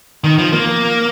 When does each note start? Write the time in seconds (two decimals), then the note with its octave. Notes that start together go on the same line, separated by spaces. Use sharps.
0.24 D#3
0.39 F3
0.53 A#3